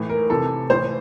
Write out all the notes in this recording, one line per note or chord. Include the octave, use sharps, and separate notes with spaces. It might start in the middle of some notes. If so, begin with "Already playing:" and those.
Already playing: A2 E3
A#4
C3 E3 A4
A2 E3 C5